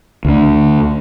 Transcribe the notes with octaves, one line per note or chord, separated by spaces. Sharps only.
D2 D3